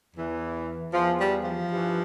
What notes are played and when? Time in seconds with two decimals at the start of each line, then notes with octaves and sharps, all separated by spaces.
0.16 E2 E3
0.93 E2 E3 F3
1.19 G3
1.44 F3
1.70 G2 E3